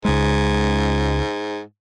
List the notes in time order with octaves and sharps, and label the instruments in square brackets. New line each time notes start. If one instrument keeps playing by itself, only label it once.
[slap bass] C#2 G#3 [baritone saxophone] G#2